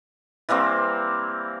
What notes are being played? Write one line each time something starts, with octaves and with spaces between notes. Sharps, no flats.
E3 G3 A#3 C4